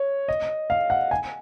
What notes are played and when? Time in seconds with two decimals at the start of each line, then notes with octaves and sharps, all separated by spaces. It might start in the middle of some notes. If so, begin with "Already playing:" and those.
Already playing: C#5
0.28 D#5
0.70 F5
0.90 F#5
1.11 G#5